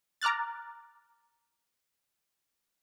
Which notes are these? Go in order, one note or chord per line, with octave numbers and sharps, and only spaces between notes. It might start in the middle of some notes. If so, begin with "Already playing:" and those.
A#5 D6 F6 F#6 A6